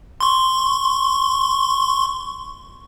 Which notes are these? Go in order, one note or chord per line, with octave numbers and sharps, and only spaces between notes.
C6 C#6